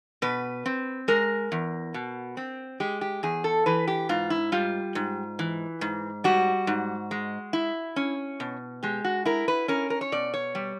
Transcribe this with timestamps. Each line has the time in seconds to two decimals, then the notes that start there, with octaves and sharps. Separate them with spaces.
0.22 B2 B4
0.66 C4
1.08 G#3 A#4
1.52 E2
1.94 B2
2.37 C4
2.80 G#3 G4
3.01 G4
3.23 E2 G#4
3.44 A4
3.66 E3 B4
3.88 G4
4.09 G#2 F4
4.30 E4
4.52 G3 F4
4.95 G#2
5.39 E3
5.81 G#2
6.24 G3 F#4
6.67 G#2
7.11 G#3
7.53 E4
7.96 C#4
8.40 B2
8.83 G#3 G4
9.04 F#4
9.25 E4 A#4
9.48 B4
9.68 C#4 A#4
9.90 A#4
10.01 C#5
10.12 B2 D5
10.34 C#5
10.55 G3